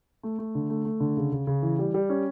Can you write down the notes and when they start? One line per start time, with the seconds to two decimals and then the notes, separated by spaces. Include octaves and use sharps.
0.23 A3
0.38 A3
0.55 D3
0.70 A3
0.85 A3
1.00 D3
1.17 C#3
1.33 C#3
1.47 C#3
1.62 E3
1.79 G3
1.94 G3
2.10 C#4